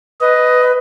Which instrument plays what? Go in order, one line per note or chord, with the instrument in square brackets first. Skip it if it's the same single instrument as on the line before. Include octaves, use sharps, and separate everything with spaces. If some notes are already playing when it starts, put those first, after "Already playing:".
[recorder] B4 [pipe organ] D#5